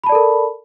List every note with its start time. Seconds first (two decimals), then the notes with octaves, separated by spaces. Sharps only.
0.04 B5
0.06 A5
0.09 D5
0.12 A4
0.15 A#4